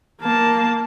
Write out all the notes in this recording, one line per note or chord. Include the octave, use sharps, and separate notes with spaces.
A#3 A5